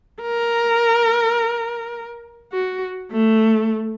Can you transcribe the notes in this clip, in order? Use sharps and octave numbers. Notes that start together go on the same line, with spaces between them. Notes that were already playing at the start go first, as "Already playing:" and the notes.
A#4
F#4
A3